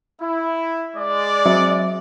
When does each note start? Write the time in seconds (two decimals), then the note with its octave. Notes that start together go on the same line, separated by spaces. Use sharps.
0.22 E4
0.96 G#3 D5
1.46 F#3 F#4 E5